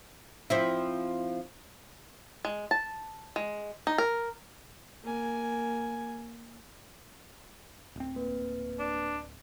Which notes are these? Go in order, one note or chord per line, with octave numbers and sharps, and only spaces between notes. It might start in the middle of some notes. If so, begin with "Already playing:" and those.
F3 C4 E4
G#3
A5
G#3
D#4
A#4
A#3 G#5
D1 C4
A#3 B4
D4